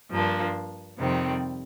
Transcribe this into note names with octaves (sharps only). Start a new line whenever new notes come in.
G2 F3 A#3 D4
F2 C3 D#3 G3 C4